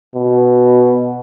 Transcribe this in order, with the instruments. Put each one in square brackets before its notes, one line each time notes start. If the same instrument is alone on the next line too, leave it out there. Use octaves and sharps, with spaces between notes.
[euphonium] B2